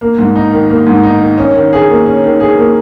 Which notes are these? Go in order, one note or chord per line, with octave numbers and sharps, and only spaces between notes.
A#3
G#2
D#4
D#3
A#3
G#2
D#4
D#3
C#4
D#3
G#4
A#3
C#4
D#3
G#4
A#3